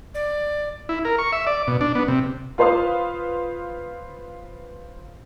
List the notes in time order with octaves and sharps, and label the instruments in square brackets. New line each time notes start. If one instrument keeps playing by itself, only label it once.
[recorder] D5
[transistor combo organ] E4
A#4
C#6
E5
D5
B2
D4
B3
C3
[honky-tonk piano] F4 B4 C5 F5 C6 D#6